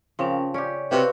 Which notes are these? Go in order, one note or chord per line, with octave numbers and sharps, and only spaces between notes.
C#3 F3 C#4 A#4 G5
C#4 G4 C#5 D5
C3 A#3 C4 F#4 B4